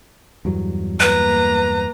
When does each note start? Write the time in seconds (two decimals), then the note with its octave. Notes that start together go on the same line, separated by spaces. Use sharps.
0.45 E2 G2 F#3
1.00 A#3 B4 A#5